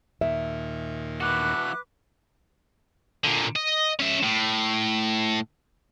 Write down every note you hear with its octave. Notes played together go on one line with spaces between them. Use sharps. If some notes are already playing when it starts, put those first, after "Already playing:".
D#2 A#2 E5
E3 F#4 B4 D6 F#6
A#2 D3
D#5
C#4 E5
A2